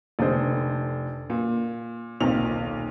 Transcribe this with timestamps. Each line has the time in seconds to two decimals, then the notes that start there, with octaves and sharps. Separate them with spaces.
0.19 F1 D3 C5 D#5
1.30 A#2
2.20 D#1 B1 A#2 C4 F7